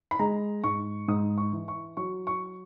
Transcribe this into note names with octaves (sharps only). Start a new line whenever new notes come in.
B5
G#3 A#5
G#2 C#6
G#2 D#6
C#6
E3
C#6
F#3 C#6
C#6